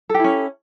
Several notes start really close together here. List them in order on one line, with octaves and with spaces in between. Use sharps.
A4 G4 E4 C#4